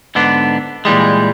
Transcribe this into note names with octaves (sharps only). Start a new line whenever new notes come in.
G#2 D3 B3 D4
A#2 E3 G3 G#3